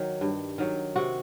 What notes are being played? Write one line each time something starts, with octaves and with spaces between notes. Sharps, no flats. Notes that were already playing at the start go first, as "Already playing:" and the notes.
Already playing: D#3 F#3
G2
D#3 F#3
C3 F#4